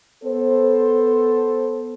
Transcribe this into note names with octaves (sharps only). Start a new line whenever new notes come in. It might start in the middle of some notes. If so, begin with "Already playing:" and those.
B3 A4 C5